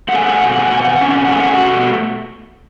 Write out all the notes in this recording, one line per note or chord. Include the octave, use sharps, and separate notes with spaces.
A3 F#5
G#5
F#5
G#5
B2 F#5
G#5
F#5
G#5
F#5
B2 G#5
F#5
G#5
F#5
C#4 G#5
F#5
G#5
F#5
A3 G#5
F#5
G#5
F#4 F#5
B2